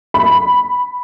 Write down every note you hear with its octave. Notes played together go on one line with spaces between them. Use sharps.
B5